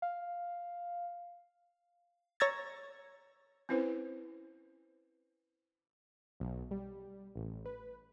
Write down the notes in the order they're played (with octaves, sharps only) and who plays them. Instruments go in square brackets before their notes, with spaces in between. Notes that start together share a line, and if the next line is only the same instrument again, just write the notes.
[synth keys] F5
[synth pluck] C#5 A#5 E6 G#6 A6
[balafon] C4 C#4 E4 B4 C5
[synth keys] B1
G3
A1
B4